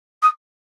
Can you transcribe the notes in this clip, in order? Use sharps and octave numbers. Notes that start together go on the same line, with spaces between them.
D#6